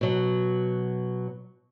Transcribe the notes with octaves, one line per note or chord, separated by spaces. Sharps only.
B2 F#3